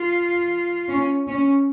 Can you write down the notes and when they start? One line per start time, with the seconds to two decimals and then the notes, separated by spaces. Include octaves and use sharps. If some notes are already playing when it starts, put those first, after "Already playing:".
Already playing: F4
0.89 C#4
1.27 C#4